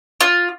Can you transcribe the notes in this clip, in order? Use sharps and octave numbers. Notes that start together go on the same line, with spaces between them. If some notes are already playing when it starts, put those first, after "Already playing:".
F4